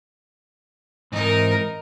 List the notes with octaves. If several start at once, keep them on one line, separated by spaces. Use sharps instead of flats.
G#2 E3 C4 D#4 A#4